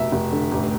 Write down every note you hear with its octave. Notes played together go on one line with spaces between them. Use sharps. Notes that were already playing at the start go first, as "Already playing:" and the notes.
Already playing: F1 B2 E5
F1
D3
A1